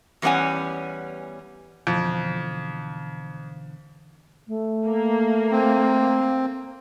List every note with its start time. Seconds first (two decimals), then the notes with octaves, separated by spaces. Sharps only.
0.22 E2 G3 B3 C#4 F#5 G#5
1.87 F2 B2 D3 E3
4.48 A3
4.88 A#3
5.52 C4